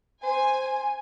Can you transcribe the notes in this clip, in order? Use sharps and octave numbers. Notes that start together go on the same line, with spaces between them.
C5 G#5